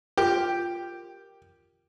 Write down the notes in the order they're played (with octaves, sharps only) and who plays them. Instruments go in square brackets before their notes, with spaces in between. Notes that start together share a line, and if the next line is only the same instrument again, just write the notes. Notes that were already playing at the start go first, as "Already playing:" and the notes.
[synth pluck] F4 A#4 [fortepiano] G4